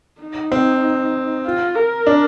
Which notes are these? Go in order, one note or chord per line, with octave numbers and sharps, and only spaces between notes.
D#4
C4
F4
A#4
D4